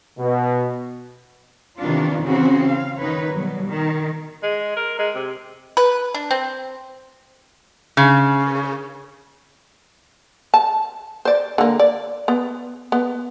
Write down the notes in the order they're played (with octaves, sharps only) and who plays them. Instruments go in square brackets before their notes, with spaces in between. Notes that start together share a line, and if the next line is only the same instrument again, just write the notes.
[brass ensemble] B2
[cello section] C3 D#3 E3 B3 D4 F4
C#3 E3 C4 C#4 F#4
F5
D#3 D#4 B4 C#5
B2 F#3 G3
D#3
[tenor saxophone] G#3
A#4
G#3
C3
[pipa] B4
D4
C4
[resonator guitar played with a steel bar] C#3
[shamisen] A5
C5 D5
D3 A#3
D5
B3
B3